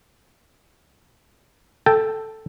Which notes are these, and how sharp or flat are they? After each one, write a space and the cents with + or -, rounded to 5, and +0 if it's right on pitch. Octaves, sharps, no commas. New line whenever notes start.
A4 +0 G5 +0